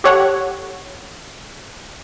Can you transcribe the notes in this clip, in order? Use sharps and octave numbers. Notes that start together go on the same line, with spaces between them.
G4 A4 C#5 F#5